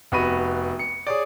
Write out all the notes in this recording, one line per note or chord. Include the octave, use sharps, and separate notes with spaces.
F1 B3 F#4 B5 D#7
C#7
G#4 C#5 D5